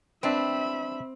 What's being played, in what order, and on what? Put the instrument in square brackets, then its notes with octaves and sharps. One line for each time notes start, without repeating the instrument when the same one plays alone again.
[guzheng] C4 [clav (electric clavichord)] D4 B4 [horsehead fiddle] E5 B5